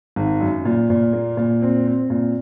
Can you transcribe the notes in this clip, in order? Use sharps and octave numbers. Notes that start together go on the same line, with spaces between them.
G#1
F#2
A#2
A#2
A#3
A#2
C4
C4
A#2